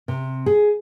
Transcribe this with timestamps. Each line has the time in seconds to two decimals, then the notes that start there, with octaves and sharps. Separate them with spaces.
0.08 C3
0.46 G#4